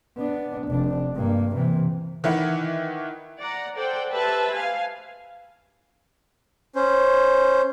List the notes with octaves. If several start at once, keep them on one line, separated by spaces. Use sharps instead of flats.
B3 D4
F1 D4
G2 A#3
C3 E3
D#3 E3 E4 F#5
D5 F#5 A#5
A4 C5 D5 F#5 G5
G4 B4 C5 E5 A5 B5
F5 G#5
C#4 C5